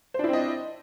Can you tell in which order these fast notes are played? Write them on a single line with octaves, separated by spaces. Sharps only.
C5 D4 E4 C4 D#5